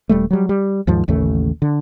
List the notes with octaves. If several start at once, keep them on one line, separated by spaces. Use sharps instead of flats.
D#1 G3 A3
F#3 G3
G3
D#2 G#2 F3
A1 D#2 C#3 A3
D3